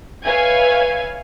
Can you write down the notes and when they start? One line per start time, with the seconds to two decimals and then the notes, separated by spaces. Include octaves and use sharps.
0.23 B4 C#5 E5 F5 G#5 G#6